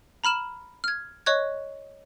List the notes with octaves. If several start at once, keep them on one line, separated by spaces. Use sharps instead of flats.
A#5 B5 F6 E7 F#7
F6 G#6
C#5 D#5 C#6 F#6 G#6